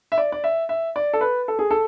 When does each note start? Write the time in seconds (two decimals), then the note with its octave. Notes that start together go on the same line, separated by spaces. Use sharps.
0.12 E5
0.18 D5
0.32 D5
0.44 E5
0.69 E5
0.96 D5
1.13 A4
1.21 B4
1.48 A4
1.59 G#4
1.71 A4